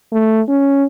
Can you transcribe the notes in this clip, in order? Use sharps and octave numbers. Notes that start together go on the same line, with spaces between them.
A3
C#4